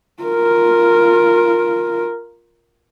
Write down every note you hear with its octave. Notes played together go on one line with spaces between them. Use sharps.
F4 A#4